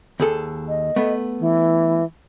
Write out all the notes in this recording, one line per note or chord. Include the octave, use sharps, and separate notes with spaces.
D#2 G#4 A4
D#5
A3 B3
E3